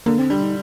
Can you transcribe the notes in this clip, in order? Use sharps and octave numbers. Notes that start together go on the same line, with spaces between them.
D3 A#3
C4
G3 D4
D#4